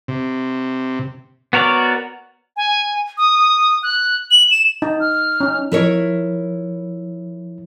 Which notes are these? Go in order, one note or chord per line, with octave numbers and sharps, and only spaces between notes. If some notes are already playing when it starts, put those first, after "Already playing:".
C3
B3 F#4 A#4 C#5 D5
G#5
D#6
F#6
F#7
E7
D#4
F6
C#4 D#4
F3 E4 A#4 C#5